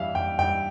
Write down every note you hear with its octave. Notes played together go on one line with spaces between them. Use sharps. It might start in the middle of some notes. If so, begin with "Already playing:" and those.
Already playing: G2 E3 E5 F5
G2 G5
G2 G5